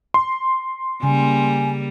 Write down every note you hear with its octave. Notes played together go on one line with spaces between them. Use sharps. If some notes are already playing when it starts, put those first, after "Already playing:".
C6
C#3 G3 A#3 G#5